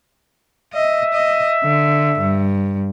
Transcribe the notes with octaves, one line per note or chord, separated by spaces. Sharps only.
D#5 E5
D#5
D3
G2